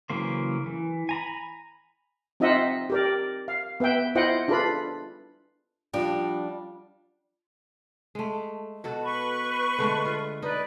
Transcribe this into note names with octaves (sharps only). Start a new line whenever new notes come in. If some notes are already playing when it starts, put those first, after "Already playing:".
C#3 E3 F#3 A#3 C5
E3
G#5 A#5 B5
C4 D#4 F4 D#5 E5 F#5
G4 A#4 D5
F5
B3 B4 E5 G5
E4 F4 C5 D#5 F#5 G5
D4 F4 G#4 A4 B4 B5
F3 G3 D4 F#4 G4
G#3 A3
B2 F#4 A4
B4 C#6
D3 G#3 A3
F4
D#4 B4 D5